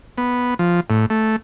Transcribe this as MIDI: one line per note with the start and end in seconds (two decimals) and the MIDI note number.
0.18 0.54 59
0.59 0.80 53
0.90 1.06 45
1.10 1.36 57